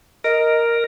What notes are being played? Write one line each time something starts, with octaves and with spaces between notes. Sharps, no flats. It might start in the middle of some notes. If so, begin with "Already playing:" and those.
A#4 D#5